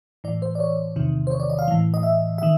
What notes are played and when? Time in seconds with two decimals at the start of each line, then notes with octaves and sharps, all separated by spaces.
0.24 A2 E3 D5
0.42 C5
0.55 D5
0.60 C#5
0.96 E2 C3 D#3
1.27 C5
1.31 C#5
1.40 D5
1.50 D#5
1.59 F5
1.68 A2 E3
1.94 D#5
2.03 E5
2.38 D#3 E5